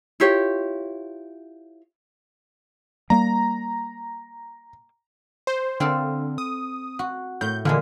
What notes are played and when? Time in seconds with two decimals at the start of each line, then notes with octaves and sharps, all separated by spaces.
0.20 E4 F4 G4 C#5
3.10 G3 A#3 A#5
5.47 C5
5.80 D3 C4 A4 F5
6.38 D#6
6.99 F#4
7.41 A2 G6
7.65 A#2 D3 E3 G#3